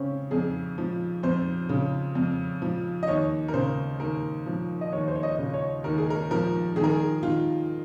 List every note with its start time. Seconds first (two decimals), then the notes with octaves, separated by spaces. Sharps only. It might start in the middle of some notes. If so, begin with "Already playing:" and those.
Already playing: C#3 C4 C#4
0.31 F2 G#4
0.78 F3
1.23 F2 C5
1.69 C#3
2.15 F2
2.62 F3
3.03 D#5
3.08 D#2 C#5
3.48 A#4
3.54 C#3 C5
4.00 D#2 A#4
4.46 F3
4.81 D#5
4.92 D#2 C#5
5.08 C5
5.15 C#5
5.23 D#5
5.38 C#3
5.54 C#5
5.84 D#2 A#4
5.98 G#4
6.10 A#4
6.31 F3 A#4
6.76 D#3 G#4
6.84 A#4
6.91 G#4
7.23 D#3 F4